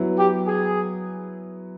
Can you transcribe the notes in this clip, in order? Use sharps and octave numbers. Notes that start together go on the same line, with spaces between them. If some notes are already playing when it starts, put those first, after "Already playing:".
Already playing: F#3 B3 E4
G4
G#4